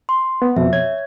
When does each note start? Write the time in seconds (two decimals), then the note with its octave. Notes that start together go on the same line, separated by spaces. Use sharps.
0.09 C6
0.42 B3
0.56 F2 B2 E5
0.73 C#5 G#6